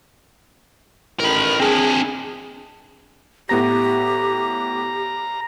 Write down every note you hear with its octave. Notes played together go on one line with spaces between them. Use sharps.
A1 D#3 A#4 B5
C4 D4 G#4
A2 B3 G4 A#5 A#6